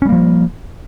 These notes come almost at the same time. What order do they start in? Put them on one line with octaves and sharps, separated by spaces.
C#4 G3 A#3 F3